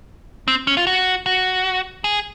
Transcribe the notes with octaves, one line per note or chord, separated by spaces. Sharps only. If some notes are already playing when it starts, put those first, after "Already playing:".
C4
C#4
F4
F#4
F#4
G#4